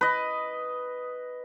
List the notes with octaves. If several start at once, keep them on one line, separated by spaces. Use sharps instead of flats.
B4 D#5